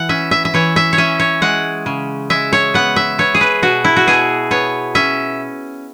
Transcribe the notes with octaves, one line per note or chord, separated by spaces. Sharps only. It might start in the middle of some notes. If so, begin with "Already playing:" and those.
Already playing: E3 F#5
C#4 E5
E5
E5
E3 C#5
E5
C#5
C#4 E5
C#5
G#3 F#5
C#3
G#3 E5
C#5
B3 F#5
E5
B3 C#5
G#4
B4
B2 F#4
E4
F#4
B2 G#4
B3 C#5
C#4 E5